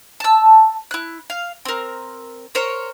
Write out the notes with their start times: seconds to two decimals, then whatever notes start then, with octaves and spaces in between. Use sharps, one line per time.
0.20 A5 E6
0.91 E4 F#6
1.30 F5
1.65 C4 A#4
2.55 A#4 C5 C#5